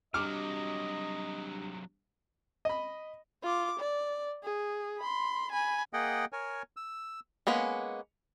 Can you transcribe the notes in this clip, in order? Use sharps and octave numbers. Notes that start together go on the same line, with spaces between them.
C3 F#3 G3 D4 G4 D#5 D6 F6
D#5 B5
F4 D6
D5
G#4
B5 C6
G#5 B5
A#3 G#4 D#5 F#5 G5
A#4 C#5 G#5
E6
G#3 A#3 B3 C#4